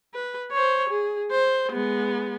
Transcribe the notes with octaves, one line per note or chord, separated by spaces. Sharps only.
B4
C5 C#5
G#4
C5
G#3 B3